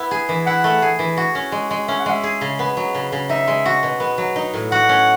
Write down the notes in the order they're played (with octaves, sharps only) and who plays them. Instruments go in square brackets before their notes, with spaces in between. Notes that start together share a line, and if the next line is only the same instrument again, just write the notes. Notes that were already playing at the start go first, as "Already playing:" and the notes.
Already playing: [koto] B3 E4
G#4
E3
[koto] E4 [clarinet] F#5
[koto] A3
G#4
E3
F#4
C#4
G#3
G#3
[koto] C#4 [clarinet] E5
[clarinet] F#5
[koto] G#3 [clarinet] E5
[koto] G#4
C#3
B3
F#3
C#3
C#3
[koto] D#4 [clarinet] E5
[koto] G#3
F#4
B2
B3
F#3
D#4
A2
[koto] F#4 [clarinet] F#5
[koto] C#4